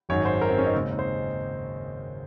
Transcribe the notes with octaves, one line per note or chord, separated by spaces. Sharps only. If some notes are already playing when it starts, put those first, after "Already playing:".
G#1 F#2 D#3 C#5
C5
A#4
C4
C#4
D#4
D#2 C#3 G#3 C4
D#4
C5